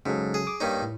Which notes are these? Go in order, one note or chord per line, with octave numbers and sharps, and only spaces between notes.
G#2 C#3 F#3 A4
G#4
D6 D#6
G2 A#3 D#4 C#5
A2